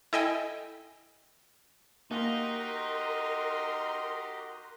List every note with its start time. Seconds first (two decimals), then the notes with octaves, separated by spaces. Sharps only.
0.13 E4 A4 D#5 E5 G5 G#5
2.11 A#3 D#4 F#4 G4 A#4 D#5 A#5 C6